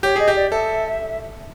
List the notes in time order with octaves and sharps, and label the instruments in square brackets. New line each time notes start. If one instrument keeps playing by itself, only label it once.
[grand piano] G4 [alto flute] C#5
[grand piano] G#4 [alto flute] D#5
[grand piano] G4
[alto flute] D5
[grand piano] A4 [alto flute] E5